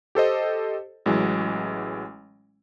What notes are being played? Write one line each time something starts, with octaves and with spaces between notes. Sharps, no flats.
G4 A4 C5 D#5
A1 E3 F#3 G#3